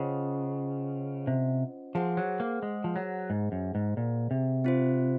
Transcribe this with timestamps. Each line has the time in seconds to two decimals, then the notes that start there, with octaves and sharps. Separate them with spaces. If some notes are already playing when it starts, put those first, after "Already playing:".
Already playing: C#3 C#4 F4 C5 D#5 F#5
1.27 C3
1.95 F3 G#4 C5 F#5
2.17 F#3
2.40 A#3
2.63 G#3
2.84 F3
2.96 F#3
3.30 G#2
3.52 F#2
3.75 G#2
3.97 A#2
4.31 C3
4.65 C4 F4 C5